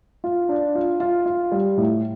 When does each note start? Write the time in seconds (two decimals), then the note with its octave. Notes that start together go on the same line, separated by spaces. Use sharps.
0.24 F4
0.49 D4
0.75 F4
1.00 F4
1.26 F4
1.52 G3
1.78 A2